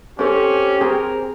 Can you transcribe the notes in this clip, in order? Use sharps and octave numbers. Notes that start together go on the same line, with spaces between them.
C4 C#4 G4 A4
C4 G#4 A#4